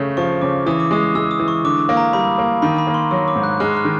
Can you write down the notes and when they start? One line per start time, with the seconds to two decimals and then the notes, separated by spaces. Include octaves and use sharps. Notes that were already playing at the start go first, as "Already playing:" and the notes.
Already playing: C#3 A3
0.17 F3 C#6
0.41 C#3 D6
0.66 E3 D#6
0.80 D6
0.91 G#3 D#6
1.15 G#3 E6
1.31 D#6
1.40 E3
1.48 C#6
1.64 D3 D6
1.89 A#3
1.97 A#5
2.13 G3 B5
2.38 A#3
2.62 D#3 B5
2.78 B5
2.87 A#3
2.94 C6
3.11 F#3 C#6
3.28 D6
3.36 G#2
3.43 F#6
3.60 G#3 F6
3.77 F6
3.85 D#3